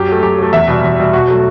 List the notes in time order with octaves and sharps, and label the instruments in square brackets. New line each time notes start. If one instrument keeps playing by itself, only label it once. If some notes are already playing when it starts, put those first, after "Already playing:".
Already playing: [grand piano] F#2 G4
F#3 A3
F#2 G4
F#3 A3
E2 E5
B2 G3
E2
B2 G3
B2 F#4
F#3 A3